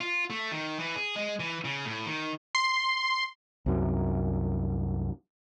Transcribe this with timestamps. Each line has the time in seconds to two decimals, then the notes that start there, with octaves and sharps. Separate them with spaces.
0.01 F4
0.30 A3
0.51 D#3
0.79 E3
0.96 G#4
1.16 G#3
1.40 E3
1.65 C#3
1.85 A2
2.06 D#3
2.55 C6
3.66 C2 F#2